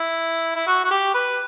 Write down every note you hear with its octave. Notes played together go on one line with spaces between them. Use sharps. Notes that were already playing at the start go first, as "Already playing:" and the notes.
Already playing: E4
E4
F#4
F#4
G4
B4